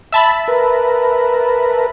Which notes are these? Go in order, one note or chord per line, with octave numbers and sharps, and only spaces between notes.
E5 A5 B5
A#4 B4